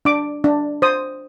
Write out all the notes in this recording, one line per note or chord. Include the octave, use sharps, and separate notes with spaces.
D4 D6
D4
C5 D#6